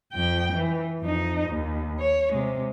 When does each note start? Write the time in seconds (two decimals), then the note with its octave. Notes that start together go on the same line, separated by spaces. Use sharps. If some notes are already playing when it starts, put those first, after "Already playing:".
0.13 F2 G5
0.53 E3
1.01 F2 D#4
1.48 D#2
1.99 C#5
2.33 C3 G#3